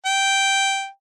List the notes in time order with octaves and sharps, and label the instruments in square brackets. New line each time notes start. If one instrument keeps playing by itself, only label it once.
[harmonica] G5